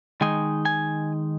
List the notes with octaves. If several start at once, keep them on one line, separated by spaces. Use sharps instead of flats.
D#3 G#3 D#4 G#5
G#5